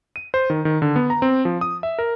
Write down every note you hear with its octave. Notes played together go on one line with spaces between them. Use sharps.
D#7
C5
D#3
D#3
D3
B3
A#5
C4
F3
D#6
E5
A#4